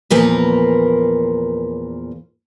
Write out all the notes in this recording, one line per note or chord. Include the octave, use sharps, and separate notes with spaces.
E2 A#2 F3 A#3 A#4 B4